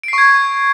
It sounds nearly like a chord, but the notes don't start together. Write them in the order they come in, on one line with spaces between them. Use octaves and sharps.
D7 C7 C#6 G#6